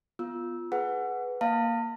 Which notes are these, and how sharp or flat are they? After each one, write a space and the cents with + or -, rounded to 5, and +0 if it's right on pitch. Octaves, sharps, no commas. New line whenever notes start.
B3 +0 F4 +0 E6 -15
G#4 +25 B4 +0 F#5 +0
A#3 +0 F5 +0 A5 +45